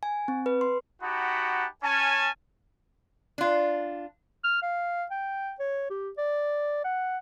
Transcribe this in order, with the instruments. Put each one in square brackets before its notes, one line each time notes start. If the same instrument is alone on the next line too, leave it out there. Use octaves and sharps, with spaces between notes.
[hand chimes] G#5
C4
B4
C6
[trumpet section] D#4 F#4 G4 F#5 A5 B5
C#4 G#5 A5
[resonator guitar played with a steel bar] D4 F4
[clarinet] F6
F5
G5
C#5
G4
D5
F#5